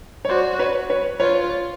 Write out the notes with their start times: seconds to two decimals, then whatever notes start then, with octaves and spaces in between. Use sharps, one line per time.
0.25 C#5
0.29 F#4 C5 D5
0.59 B4 C#5
0.90 B4 C#5
1.20 F4 B4 C#5